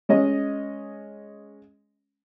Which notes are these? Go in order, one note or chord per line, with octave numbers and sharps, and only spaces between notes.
G#3 C#4 D#5